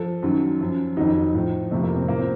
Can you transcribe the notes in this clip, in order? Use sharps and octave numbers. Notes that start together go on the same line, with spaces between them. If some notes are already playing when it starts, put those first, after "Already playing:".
Already playing: F3 A4
F#2 D#3 F#3
F#2 F3
F2 D#3 F#3 D#4
A2 F3
F2 C3 F3 A3
A#3
C4
A2 F3 A#3
C4